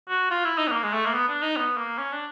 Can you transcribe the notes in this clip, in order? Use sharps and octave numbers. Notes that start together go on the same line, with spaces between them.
F#4
F4
E4
D#4
B3
A#3
G#3
A3
A#3
B3
D4
D#4
B3
A#3
C#4
D4